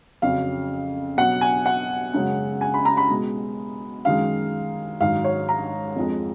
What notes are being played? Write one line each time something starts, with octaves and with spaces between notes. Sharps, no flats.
F2 C#3 F#3 F5
B2 F#3 F#5
G#5
F#5
F#2 C#3 G#3
G#5
B5
A#5
B5
B2 G#3
F#2 D#3 G#3 F5
G#2 D#3 F#3 F5
C#5
A#5
F2 F3 G#3